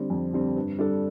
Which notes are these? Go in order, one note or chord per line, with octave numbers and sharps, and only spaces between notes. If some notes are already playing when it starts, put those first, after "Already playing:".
Already playing: D3 G3 C4
F2
D3 G3 C4
G2
G3 D4 A4